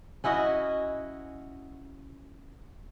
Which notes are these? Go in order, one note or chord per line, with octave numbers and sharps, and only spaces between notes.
C#4 E4 F#4 D#5